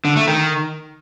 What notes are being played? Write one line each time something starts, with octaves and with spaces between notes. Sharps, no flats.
D3
A3
D#3